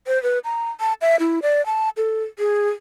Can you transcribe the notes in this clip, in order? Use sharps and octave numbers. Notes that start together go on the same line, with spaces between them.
C5
B4
A#5
A5
E5
E4
D5
A5
A4
G#4